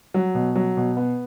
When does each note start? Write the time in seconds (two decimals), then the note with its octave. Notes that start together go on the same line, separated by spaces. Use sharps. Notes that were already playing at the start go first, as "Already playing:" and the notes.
0.14 F#3
0.35 B2
0.55 F#3
0.77 B2
0.97 B3